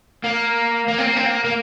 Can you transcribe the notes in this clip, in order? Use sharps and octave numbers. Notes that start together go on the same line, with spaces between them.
A#3
A#3
C4
A#3
C4
A#3
A#3